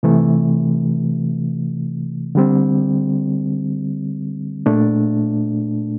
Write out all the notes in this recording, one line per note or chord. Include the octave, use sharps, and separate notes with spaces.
C3 E3 A3
D3 G3 C4
A#2 A3 D4